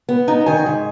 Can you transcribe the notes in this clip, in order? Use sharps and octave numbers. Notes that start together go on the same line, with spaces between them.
B3
D#4
D#3 G#5
G#2